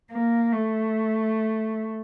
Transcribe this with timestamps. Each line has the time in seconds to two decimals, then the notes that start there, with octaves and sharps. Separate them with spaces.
0.11 A#3
0.52 A3